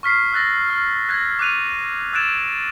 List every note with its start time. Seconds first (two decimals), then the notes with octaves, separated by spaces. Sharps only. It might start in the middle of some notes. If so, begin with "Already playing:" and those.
0.03 C#6 F6 B6 C7
0.33 E6 F#6 A6 A#6
0.70 F6
1.09 F#6 G#6 A#6
1.39 D6 F#6 D#7 F7
2.13 E6 F#6 G#6 A6 D7 E7